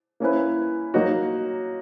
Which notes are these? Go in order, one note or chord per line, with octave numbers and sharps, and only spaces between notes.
A#3 C#4 E4 B4
F#3 A#3 D#4 F#4 C#5